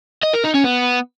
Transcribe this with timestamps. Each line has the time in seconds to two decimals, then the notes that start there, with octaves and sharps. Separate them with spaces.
0.23 D#5
0.33 A#4
0.44 D#4
0.54 C#4
0.64 B3